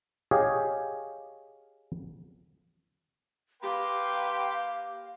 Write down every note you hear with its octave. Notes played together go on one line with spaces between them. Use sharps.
G4 G#4 C#5 D#5 F5
A#3 G4 B4 F5 G5 C6